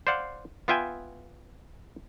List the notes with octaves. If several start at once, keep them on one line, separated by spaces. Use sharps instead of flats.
C5 D5 F5 F#5
B3 F4 E5 G5 G#5